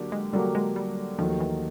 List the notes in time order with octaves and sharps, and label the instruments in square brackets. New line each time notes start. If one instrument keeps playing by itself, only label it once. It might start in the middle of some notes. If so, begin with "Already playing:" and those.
Already playing: [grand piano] D3 F#3 A#3 D4 G4
[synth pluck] G#3
[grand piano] D3 F#3 A#3 D4 G4 [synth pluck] G3
[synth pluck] G#3
G3
[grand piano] D#2 D#3 F#3 A3 [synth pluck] F3
[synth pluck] E3